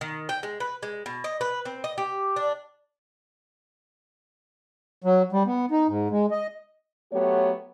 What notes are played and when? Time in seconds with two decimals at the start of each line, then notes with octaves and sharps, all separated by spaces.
0.01 D#3
0.29 G5
0.43 G#3
0.60 B4
0.83 G#3
1.06 B2
1.24 D#5
1.41 B4
1.65 C4
1.84 D#5
1.98 G4
2.36 D4
5.04 F#3
5.32 G3
5.47 B3
5.71 D#4
5.88 G#2
6.11 G#3
6.31 D#5
7.12 F#3 A3 B3 G4 C#5